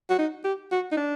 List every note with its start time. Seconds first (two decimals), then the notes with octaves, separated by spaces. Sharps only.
0.10 F#4
0.18 D#4
0.44 G4
0.72 F#4
0.92 D#4
0.97 D4